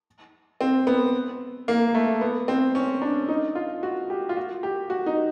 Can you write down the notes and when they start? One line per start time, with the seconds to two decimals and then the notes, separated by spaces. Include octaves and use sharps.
0.61 C4
0.87 B3
1.68 A#3
1.95 A3
2.21 B3
2.48 C4
2.75 C#4
3.02 D4
3.28 D#4
3.55 F4
3.83 F#4
4.10 G4
4.29 F4
4.36 F#4
4.63 G4
4.90 F#4
5.06 D#4